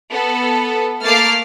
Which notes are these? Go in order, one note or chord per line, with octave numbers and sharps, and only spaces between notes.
B3 A4
A3 A#3 D6 F6 A6 C7